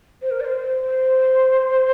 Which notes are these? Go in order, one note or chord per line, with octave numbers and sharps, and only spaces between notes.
C5
A#4
D5
C5